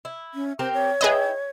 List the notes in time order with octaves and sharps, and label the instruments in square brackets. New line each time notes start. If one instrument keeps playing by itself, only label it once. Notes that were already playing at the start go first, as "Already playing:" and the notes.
[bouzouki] E4
[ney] C#4
[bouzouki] C4 G4 A#4 [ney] C5
[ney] C#5
[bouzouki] D#4 E4 G5 [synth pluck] G#4 B4 D#5